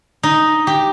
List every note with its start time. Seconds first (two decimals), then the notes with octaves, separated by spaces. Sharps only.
0.23 D#4
0.67 G4